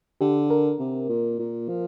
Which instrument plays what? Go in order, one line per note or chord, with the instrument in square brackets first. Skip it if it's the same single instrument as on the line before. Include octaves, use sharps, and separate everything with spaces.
[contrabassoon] D3 [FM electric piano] G4
[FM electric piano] A#4
[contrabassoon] C3
A#2
A#2
F3